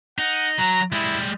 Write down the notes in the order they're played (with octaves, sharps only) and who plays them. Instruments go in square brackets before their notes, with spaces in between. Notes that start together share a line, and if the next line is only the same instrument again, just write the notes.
[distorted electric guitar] D#4 [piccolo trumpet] F#5
[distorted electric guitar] F#3 [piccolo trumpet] A#5
[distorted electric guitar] G3 G#3 [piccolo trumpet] E4